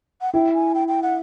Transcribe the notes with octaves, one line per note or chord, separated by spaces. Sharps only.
F#5
E4 G5
G#5
G5
G5
F#5